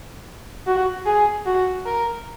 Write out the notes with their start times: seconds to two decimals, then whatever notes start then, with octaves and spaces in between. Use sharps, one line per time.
0.66 F#4
1.06 G#4
1.46 F#4
1.85 A#4